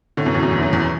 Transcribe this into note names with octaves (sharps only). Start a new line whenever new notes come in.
A2 D3
F#2 B2
E2 A2
F#2
E2
A2
F#2
E2